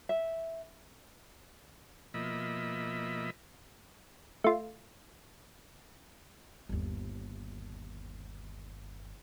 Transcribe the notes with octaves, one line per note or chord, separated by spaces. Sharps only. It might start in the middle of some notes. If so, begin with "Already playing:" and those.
E5
B2 F3 A#3 D#5 E5 B5
A3 F4
G1 D#2